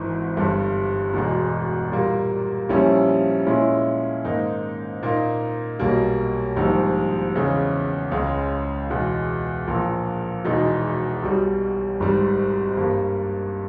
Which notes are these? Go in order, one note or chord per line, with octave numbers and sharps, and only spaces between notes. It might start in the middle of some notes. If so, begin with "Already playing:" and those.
Already playing: G#1 G#2 E3
G1 G2 G3
E1 E2 B2 G#3
A#2 G3 A#3
A#1 A#2 G3 C#4 E4
A#2 G#3 C#4 E4
G#2 D#3 A#3 D#4
A#2 A#3 D#4
B1 B2 G3 A#3
A#1 G#2 D#3 G3
E2 C#3 G#3
C#2 C#3 G#3
E2 B2 G#3
A#1 A#2 A#3
E1 E2 B2 G#3 D#4
B1 B2 G3
G#1 G#2 G3
G2 G3 A#3